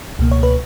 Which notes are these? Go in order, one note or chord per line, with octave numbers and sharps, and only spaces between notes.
C#2 B2 A#3
C#5
B4